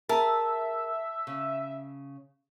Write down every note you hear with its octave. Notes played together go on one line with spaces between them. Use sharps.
G#4 A#4 E5 A5
C#3